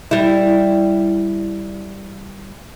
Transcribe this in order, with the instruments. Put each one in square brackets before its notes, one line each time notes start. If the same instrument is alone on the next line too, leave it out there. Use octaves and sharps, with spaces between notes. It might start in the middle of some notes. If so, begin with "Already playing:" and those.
[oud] G3 E4